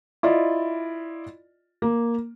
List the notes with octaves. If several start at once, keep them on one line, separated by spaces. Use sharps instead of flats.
E4 F4 D5 D#5
A#3